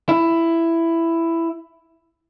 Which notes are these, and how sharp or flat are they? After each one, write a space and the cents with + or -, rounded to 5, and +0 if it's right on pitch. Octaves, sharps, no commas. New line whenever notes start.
E4 +10